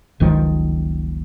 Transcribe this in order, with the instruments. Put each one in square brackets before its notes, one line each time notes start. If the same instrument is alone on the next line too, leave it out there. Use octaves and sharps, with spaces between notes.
[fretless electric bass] F#1 C#2 D#3 F3